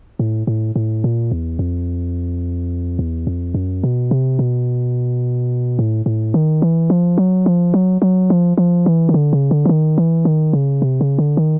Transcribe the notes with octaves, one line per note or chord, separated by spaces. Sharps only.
A2
A2
A2
A#2
E2
F2
E2
F2
F#2
B2
C3
B2
A2
A2
D#3
E3
F3
F#3
F3
F#3
F#3
F3
F3
E3
D#3
D3
C#3
D3
E3
D#3
E3
D#3
C#3
C3
C#3
D3
D#3